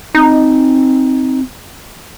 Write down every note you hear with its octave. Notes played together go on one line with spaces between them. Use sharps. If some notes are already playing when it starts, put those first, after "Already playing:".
C4 D#4